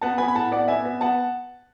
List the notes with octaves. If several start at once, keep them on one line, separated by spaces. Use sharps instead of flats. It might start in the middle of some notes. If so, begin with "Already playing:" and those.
B3 F#5 A5
B3 G#5 B5
B5
A2 F#5 A5
B3 D5 F#5
B3 E5 G#5
B3
B3 F#5 A5